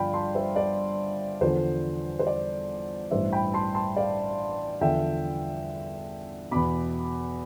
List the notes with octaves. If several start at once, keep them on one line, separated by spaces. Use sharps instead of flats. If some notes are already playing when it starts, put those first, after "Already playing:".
Already playing: G1 G2 F3 D5 F5 G5 B5
A5 C6
C5 E5
D5
E2 D3 F3 C5
C5
D5
A1 G2 E3 C5 E5
G5 B5
A5 C6
A5 C6
D5 F5
E2 D3 F3 E5 G5
E2 B2 B5 D6